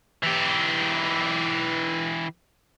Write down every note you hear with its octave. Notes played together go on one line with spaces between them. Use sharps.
E3 G4